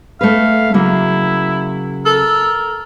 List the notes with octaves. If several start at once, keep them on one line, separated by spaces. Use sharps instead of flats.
A3 B4 F5
C#3 F#3 A#3 E4
A4 A#4